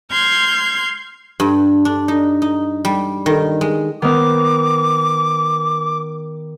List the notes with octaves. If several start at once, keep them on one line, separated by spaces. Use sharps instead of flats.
C6 F6 G6 G#6
G2
D4
D#4
D#4
G3
D#3
G#3
D#3 B3 D6